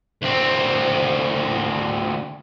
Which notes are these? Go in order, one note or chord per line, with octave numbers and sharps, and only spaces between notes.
D2 C4